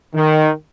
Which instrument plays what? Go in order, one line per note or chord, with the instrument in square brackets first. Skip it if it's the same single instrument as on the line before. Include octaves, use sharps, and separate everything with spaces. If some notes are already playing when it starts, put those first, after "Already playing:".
[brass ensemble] D#3